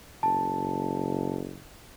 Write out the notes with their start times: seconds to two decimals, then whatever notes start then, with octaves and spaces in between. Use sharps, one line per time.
0.23 F#1 A5